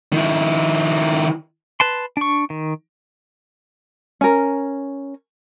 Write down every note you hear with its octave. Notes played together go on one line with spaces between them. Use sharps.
D#3 E4
B4 A5 C6
D4 C#6
D#3
C#4 A#4